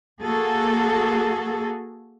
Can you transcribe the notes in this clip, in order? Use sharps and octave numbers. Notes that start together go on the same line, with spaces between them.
A#3 F#4 G#4 A4